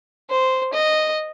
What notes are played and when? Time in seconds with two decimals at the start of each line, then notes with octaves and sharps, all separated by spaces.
0.30 C5
0.73 D#5